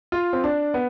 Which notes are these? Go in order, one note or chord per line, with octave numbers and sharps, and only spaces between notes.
F4
C4
D4
B3